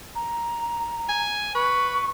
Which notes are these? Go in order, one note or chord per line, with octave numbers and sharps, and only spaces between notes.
A#5
G#5
B4 C#6